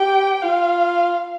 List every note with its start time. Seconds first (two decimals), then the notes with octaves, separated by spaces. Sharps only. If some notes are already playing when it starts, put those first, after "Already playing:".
Already playing: G4 G5
0.42 F4 F5